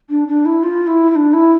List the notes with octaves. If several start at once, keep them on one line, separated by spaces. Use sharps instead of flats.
D4
D4
E4
F4
E4
E4
D4
E4